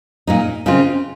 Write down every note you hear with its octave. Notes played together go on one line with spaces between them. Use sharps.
A#2 G#3 D#4
C#3 G#3 C4 F4